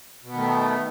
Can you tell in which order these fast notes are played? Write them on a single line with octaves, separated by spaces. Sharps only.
B2 B3 D#3 A3